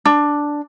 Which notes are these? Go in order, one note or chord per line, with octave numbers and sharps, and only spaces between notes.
D4